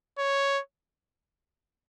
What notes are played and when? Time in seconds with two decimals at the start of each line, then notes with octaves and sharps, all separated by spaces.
0.18 C#5